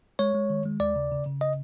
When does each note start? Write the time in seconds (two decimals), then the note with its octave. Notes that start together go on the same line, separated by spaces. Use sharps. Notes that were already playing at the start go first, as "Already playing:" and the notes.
0.19 G#3 C#5
0.35 G#3
0.50 D#3
0.66 G#3
0.80 D#2 D5
0.96 C#3
1.11 C#3
1.26 C#3
1.41 D#5